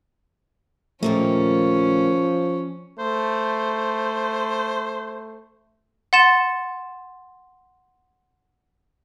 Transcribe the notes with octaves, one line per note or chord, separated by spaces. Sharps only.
D#2 A#2 F3 A3 A#3 C#4
A3 C5
F#5 C6 A6 E7